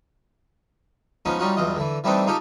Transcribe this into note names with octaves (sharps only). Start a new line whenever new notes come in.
F3 G#3 B3 C#4 D#4
G3 C#4 D#4 F4 F#4
E2 G2 F#3 F4 D#5
D3 E3
E3 G3 A3 C4 D4 D#4
G#3 D#4 F4 G4 A4